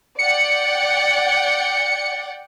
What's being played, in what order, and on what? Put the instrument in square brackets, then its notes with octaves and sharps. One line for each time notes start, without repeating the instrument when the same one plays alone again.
[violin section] D5 F#5 G5 [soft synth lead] C#7